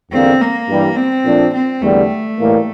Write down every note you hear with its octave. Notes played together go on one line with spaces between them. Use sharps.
E2 D3 G3 A#3 C4
A#3
G2 E3 G3
C4
A#2 F3 A3 D4
C4
E2 D3 G3 A3
A2 E3 G3 A#3